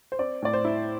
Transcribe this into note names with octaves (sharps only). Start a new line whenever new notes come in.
C5
C4 D5
A2 D5
C5
E4